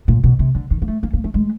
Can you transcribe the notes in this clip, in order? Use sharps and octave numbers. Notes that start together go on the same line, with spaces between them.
A#2
B2
C3
D3
D#3
A#3
A3
A#3
A#3
A3
G#3